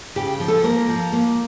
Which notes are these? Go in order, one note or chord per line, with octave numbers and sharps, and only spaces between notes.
C#3 G4
F3
A4
A#3 A#4
F3
A#3